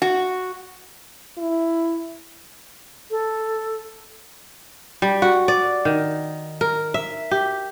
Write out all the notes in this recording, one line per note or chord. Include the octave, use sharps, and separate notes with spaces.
F#4
E4
A4
G3
F#4
D5
D#3
A#4
E5
G4